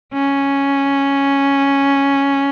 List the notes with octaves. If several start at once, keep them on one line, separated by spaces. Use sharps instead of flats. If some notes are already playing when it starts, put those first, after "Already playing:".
C#4